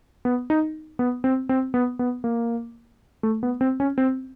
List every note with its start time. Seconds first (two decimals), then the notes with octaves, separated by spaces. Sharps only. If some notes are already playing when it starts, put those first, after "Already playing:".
0.25 B3
0.50 D#4
0.99 B3
1.24 C4
1.49 C4
1.74 B3
1.99 B3
2.24 A#3
3.23 A3
3.43 B3
3.61 C4
3.80 C#4
3.98 C4